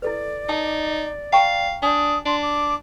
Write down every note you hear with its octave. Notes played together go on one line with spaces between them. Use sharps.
E4 A4 B4 D5
D#4 A5 D#6
F5 G5 A#5 C#6
D4 D5 G#5 D#6
D4 C6
D6